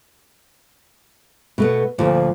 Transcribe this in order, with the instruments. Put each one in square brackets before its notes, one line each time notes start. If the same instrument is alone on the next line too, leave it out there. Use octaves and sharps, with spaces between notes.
[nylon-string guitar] B2 A3 B3
[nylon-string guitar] D2 A#2 [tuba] F3